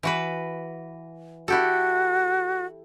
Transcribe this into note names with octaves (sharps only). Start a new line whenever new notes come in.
E3 F#4 B4
E4 F#4 G4 A4